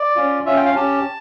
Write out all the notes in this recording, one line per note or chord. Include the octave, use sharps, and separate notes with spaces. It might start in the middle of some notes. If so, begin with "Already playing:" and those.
Already playing: D5
C#4 F4
C#4 F4 E5
G5
F5
C#4 G4 A5